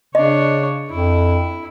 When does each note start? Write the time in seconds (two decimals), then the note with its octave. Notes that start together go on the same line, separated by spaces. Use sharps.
0.15 C#3 D4 C#5 D#5
0.90 F2 E4